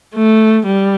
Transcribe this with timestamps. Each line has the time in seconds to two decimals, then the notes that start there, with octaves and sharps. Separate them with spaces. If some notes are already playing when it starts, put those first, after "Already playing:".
0.15 A3
0.66 G3